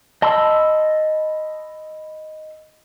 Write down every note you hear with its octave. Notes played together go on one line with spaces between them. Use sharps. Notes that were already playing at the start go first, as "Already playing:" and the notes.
D#5 A5 B5 C6 E6